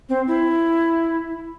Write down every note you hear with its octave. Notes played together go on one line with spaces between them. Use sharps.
C4
E4